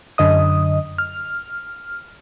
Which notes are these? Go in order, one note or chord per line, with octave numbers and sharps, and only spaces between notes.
F#2 D3 D#5 D#6
F6